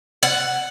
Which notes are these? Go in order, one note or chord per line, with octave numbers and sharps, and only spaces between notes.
F#5